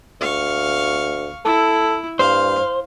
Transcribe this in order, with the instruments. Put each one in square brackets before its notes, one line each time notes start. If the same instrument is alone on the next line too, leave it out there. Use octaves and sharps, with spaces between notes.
[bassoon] D2 [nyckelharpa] F5 C#6
[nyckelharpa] E4 [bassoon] A4
[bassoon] G2 [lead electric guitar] C5 [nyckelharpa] F5